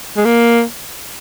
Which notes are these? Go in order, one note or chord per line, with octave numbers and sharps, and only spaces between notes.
G#3
A#3